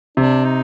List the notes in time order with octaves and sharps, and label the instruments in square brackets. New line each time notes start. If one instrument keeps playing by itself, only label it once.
[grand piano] C3 [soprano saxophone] D4
[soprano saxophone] D#4